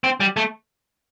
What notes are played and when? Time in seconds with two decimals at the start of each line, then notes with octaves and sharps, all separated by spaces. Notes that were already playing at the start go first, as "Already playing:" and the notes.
0.04 C4
0.20 G3
0.37 A3